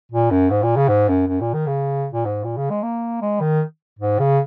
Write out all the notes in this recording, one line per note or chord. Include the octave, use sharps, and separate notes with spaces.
A#2
F#2
G#2
A#2
C#3
G#2
F#2
F#2
A#2
D#3
C#3
A#2
G#2
A#2
C#3
G#3
A#3
G#3
D#3
G#2
C#3